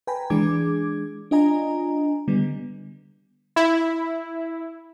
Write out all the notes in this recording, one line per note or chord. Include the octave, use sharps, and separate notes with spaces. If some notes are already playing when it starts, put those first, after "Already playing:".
B4 G5 G#5 A#5 B5
E3 G#3 D4 G#4 D6 G#6
D4 F4 D#5 G#5 A#5
D3 G3 B3
E4